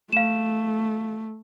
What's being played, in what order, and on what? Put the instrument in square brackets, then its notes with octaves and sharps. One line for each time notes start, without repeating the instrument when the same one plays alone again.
[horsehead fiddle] A3 [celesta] F5 E7